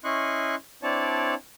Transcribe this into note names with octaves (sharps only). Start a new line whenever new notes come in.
C#4 E4 D#5 C6 C#6 F#6
C4 D4 E4 C#5 D5 A5